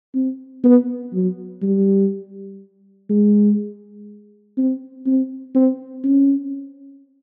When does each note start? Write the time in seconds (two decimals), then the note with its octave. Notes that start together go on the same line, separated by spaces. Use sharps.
0.15 C4
0.64 B3
1.13 F#3
1.63 G3
3.10 G#3
4.57 C4
5.06 C4
5.55 C4
6.04 C#4